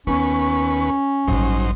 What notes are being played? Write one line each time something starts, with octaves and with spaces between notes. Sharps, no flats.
D#2 B3 C#4 B4 C#6
A1 G2 F#3 D#4 C5